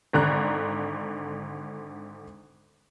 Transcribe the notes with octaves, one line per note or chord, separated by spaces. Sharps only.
G#1 D3 A#5 F#6